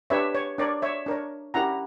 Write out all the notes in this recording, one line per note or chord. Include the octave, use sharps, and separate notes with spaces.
D4 G4 B4 C#5 E5
C#5
D4 A#4 C#5 D5
C#5 E5
D4 A#4 C#5
C#4 E4 G4 A#4 F#5 A#5